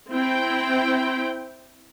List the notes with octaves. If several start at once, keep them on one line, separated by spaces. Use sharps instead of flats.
C4 E4 G5